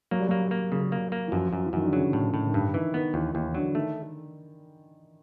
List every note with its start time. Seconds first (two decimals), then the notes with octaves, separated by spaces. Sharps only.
0.11 F#3 A#3
0.20 G3
0.29 F#3 A#3
0.51 A#3
0.72 C#3 F#3
0.92 A#3
1.12 A#3
1.28 E3
1.32 F#2 F3
1.53 F#2
1.66 E3
1.73 F#2 D#3
1.85 D3
1.93 C#3 F#3
2.13 A2
2.34 A2
2.47 D#3
2.54 G2 D3
2.74 D#3 E3
2.94 D#3 B3
3.14 D#2 E3
3.34 D#2 E3
3.55 D3 F#3
3.75 D#3 A3